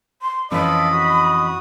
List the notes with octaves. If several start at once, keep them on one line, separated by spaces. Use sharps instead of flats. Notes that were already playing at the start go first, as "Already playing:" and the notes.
C6
F2 E3 C#4 F4 A4 D#5 B5 D6
F#4 D#6